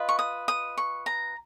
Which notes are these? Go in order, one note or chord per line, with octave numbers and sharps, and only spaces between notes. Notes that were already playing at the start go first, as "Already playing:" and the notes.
Already playing: F4 B4 D#5
C#6
D#6
D#6
C#6
A#5